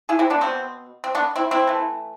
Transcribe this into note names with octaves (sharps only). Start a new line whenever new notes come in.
E4 G#4
C4 E4
B3 D4
B2 B3 C4
C4
B3 D4
C4 E4
C4 E4
E3 A3